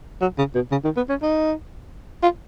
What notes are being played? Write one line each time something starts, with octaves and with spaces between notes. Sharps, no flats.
F#3
C#3
B2
C#3
D#3
B3
C#4
D#4
F4